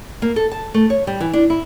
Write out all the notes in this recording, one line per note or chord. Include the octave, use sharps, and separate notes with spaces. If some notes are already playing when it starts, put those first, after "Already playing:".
A#3
A4
A5
A3
C#5
G3
E3
D4
E4